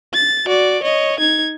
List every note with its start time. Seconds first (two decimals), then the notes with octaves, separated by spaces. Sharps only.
0.13 A6
0.47 F#4 D5
0.83 C#5 D#5
1.20 D#4 G#6